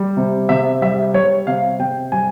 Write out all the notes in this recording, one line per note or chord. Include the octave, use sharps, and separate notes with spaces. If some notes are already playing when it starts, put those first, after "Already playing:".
Already playing: G3
C3
C3 E5
G3 E5
G3 C#5
C3 F5
C3 G5
G3 G#5